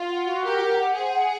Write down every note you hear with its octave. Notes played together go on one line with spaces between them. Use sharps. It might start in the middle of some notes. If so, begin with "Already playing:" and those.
Already playing: F4
F#5
F#4
G4 A#4
F#5
F#5
G#4 C5
F#5